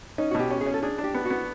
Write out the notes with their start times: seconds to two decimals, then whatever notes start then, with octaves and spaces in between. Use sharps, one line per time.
0.18 C#4 D#4
0.31 F#4
0.35 B2 G4
0.51 C#4
0.61 G#4
0.66 C#4
0.74 A4
0.83 D4 G#4
0.98 D4
1.04 G4
1.14 B3
1.25 B3 F#4